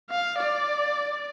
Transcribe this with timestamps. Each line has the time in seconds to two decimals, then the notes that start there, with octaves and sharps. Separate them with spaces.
0.11 F5
0.39 D5